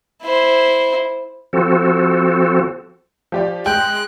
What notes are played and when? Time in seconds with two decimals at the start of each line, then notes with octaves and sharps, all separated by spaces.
0.23 E4 C5
1.53 F3 C4 F#4 A4
3.32 F3 G4 D5
3.66 G#3 G5 F#6